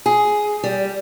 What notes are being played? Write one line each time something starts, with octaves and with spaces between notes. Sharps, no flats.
G#4
G3